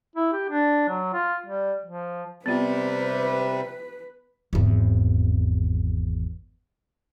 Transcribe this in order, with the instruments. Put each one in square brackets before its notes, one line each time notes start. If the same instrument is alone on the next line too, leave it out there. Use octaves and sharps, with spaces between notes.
[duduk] E4
G4
D4
F#3
F4
G3
F3
[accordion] C3 G3 [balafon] B3 F4 [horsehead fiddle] B4
[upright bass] G#1 E2